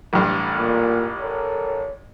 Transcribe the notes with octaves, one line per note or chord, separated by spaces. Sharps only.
A1 G2
A#2
A4 A#4 C#5